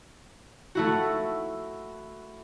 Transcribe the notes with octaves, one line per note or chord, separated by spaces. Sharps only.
A3 E4 F#4